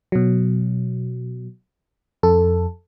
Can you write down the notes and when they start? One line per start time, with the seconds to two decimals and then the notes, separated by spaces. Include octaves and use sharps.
0.12 B2 F#3
2.23 F2 A4